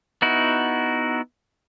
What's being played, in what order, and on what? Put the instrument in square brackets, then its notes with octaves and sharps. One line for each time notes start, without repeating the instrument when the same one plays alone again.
[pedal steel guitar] B3 D#4 E4 F#4